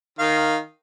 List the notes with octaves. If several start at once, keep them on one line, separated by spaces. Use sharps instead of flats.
D#3 F5